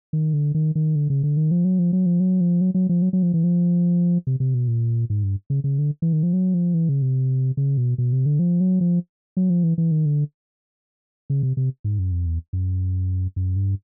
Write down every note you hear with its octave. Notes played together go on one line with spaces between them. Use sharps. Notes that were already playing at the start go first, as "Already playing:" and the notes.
D#3
D3
D#3
D#3
D3
C#3
D3
D#3
F3
F#3
F3
F#3
F3
F#3
F3
F#3
F#3
F3
F#3
F#3
F3
E3
F3
C3
C3
B2
A#2
G#2
G2
C#3
C#3
D3
E3
D#3
F3
F#3
F3
E3
C#3
C3
C#3
B2
B2
C3
D3
F3
F#3
F3
F#3
F3
E3
E3
D#3
D3
C#3
C3
C3
G#2
F#2
F2
E2
F#2
F#2
G2